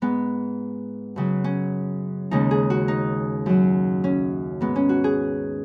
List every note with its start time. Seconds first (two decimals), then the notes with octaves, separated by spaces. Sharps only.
0.02 G#2 G#3 B3
1.16 F#2 C#3 F#3
1.44 C#4
2.31 D#2 C#3 G#3 D#4
2.51 G#4
2.70 F#4
2.88 D#4
3.46 F#2 F#3
4.04 C#4
4.61 G#2 G#3 B3
4.76 C#4
4.89 F#4
5.04 G#4